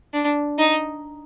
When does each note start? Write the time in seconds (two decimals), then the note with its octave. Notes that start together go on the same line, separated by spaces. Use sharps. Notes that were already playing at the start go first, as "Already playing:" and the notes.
0.13 D4
0.58 D#4